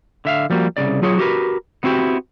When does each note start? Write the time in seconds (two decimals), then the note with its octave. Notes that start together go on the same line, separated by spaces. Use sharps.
0.25 D3 E5 F5
0.50 F3 G3 A#3 F#4
0.77 C2 C#3 D5
1.02 F#3 F4 G#4 C#5
1.18 F#4 G4 A#4 B4
1.83 B3 C4 E4 F#4 G4